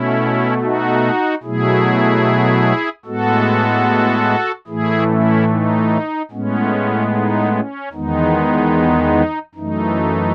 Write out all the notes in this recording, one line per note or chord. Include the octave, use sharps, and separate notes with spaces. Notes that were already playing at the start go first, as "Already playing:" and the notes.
Already playing: B2 A3 C#4 E4
D#4 F#4
B2 F#3 A3 E4 G#4
A2 G#3 B3 F#4 A4
A2 E3 A3 E4 G#4
C#4 E4
D#4
A2 G#3 B3 C#4
D#4
C#4
E2 D#3 G#3 B3 D#4
F#2 E3 A3 D#4